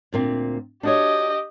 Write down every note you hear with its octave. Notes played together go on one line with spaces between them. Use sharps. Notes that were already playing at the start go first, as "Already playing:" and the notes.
D2 A#2 C4
D4 F#4 G4 C#5 D#5